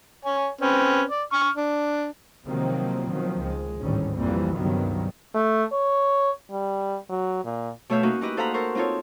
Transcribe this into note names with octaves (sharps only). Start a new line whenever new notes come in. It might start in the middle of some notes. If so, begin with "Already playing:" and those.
C#5 G#5
C4 C#4 B4
D5
C#6 F6
D4
C3 D#3 F3 F#3 A#3 C4
B2 D#3 F3 F#3
C#2 G#3
G#1 D2 A2 D#3 G3 C#4
A#1 F2 E3 G3 A#3 C4
C#2 G2 C3 D#3 F#3 B3
A3
C#5
G3
F#3
A#2
B2 A3 C#5 E5 F5 G6
A#3 C#4 D#4 F#4
D#4 E4 G4 B4 D#5
A4 C5 F5 F#5 A#5 B5
A4 A#4 C5 C#6
C4 D#4 F4 A4 C#5